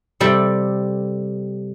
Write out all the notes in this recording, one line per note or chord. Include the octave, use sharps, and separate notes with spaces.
C3 G3 A4